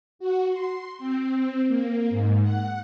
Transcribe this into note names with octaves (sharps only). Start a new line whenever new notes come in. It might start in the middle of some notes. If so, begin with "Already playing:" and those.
F#4
C6
C4
A#3
G#2
F#5